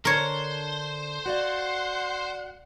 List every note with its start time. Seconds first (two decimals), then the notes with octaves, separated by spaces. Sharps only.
0.05 D3 D4 A4 A#4 C5 C#5
1.26 F#4 D5 F5 F#5